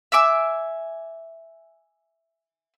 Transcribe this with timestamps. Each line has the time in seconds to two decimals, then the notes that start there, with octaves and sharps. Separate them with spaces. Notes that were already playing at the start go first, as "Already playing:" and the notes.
0.12 E5 G#5 D6 E6